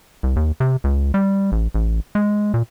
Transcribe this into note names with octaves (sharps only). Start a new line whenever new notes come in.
C2
D#2
C3
C#2
G3
A1
A1
G#3
A#2